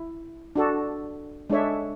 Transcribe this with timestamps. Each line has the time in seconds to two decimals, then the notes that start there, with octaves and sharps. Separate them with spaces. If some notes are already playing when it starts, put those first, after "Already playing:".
Already playing: E4
0.56 D4 F#4 A4
1.50 G#3 D4 A4 C#5 E5